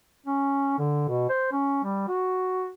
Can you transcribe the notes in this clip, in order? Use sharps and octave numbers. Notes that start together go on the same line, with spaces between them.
C#4
D3
B2
C5
C#4
G3
F#4